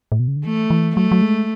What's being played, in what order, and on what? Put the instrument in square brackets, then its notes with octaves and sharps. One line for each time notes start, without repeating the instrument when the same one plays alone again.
[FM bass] A2
B2
C#3
D3
[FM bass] E3 [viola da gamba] A3
[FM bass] E3
[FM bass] F#3 [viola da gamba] A3
[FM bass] F#3
G#3